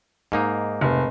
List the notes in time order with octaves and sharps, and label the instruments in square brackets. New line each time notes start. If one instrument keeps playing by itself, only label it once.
[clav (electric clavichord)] G#2 A#3 D#4
[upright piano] F1